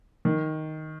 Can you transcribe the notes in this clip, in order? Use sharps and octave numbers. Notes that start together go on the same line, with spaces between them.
D#3